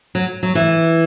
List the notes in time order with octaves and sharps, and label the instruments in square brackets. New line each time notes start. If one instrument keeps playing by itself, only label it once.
[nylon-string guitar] F#3
F#3
E3